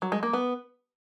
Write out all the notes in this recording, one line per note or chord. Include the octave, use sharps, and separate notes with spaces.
F#3
G#3
A#3
B3